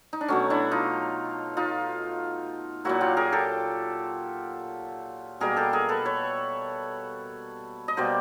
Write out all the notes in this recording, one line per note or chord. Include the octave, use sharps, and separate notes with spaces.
D#4
D4
B2 F#3 A3 C#4
D4 E4
D#4 F4
D#4 F4
A#2 F#3 A#3 E4 F#4
F4 G4
G#4 A#4
G4 A4
B2 G3 A#3 G#4 A#4
G4 A4
G#4 A#4
A4 B4
B4 C#5
D#5
B2 G3 A#3 C5 D5